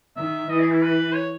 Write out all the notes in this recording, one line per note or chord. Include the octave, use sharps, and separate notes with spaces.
D#3 E5
E3 D#5
G#4
E4
B4
C#5